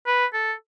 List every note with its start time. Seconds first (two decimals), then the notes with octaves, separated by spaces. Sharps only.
0.07 B4
0.34 A4